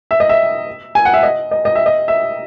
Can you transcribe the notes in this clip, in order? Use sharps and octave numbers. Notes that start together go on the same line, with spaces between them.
E5
D#5
E5
G#5
F#5
E5
D#5
D#5
D#5
E5
D#5
E5